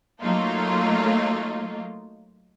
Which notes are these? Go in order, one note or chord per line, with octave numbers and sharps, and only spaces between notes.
F#3 A3 A#3 D#4 F4